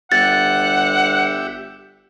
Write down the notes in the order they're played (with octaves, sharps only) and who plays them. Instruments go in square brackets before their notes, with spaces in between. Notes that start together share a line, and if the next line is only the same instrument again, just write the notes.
[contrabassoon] G1 [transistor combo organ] G4 E5 [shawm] F#5 [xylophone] A6